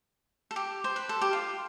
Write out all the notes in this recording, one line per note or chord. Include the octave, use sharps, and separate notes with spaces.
A4
G4
C5
B4
A4
G4
F4